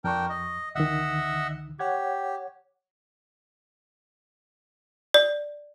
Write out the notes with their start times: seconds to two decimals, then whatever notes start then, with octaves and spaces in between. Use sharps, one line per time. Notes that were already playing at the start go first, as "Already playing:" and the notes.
0.04 F2 D4 A#4 G5 C#6
0.29 D#5
0.75 C#2 D3 D#3 D#5 E5 F#5
1.79 G4 C#5 F#5 G#6
5.14 D5